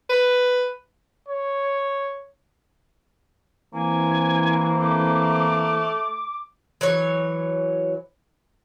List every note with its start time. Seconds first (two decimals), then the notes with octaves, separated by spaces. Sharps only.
0.09 B4
1.29 C#5
3.74 E3 A#3 C4 G#5
4.80 A3 D6
6.81 E3 F#3 C#5